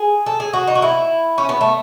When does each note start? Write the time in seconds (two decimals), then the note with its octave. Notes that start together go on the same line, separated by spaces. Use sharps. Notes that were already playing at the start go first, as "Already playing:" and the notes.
Already playing: G#4
0.26 A4
0.40 G#4
0.53 F#4
0.67 D#4
0.75 F#4
0.82 E4
1.38 C#4
1.49 B3
1.61 A3